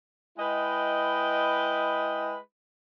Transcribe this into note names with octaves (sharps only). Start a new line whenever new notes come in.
G#3 E4 B4 D#5 G5